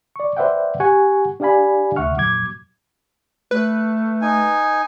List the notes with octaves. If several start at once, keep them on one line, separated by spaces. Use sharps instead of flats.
D5 C#6
B4 C5 D5 E5 F#5 G5
G4 F#5 G#5 C#6
D4 G4 D5 F5 G#5 B5
D2 C3 E5 F#5 C#6 F6
F2 A#2 F#3 D6 G#6
A3 B4
D#4 G#5